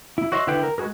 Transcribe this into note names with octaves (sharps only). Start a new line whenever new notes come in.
E4
F#4 C#5 D#5 E5 C6
D3 E4 B4 F#5 G5
A#4
G#3 F#4 G#4 A#4